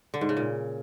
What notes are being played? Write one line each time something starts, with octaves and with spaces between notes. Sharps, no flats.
D3
G#2
C#3
A#2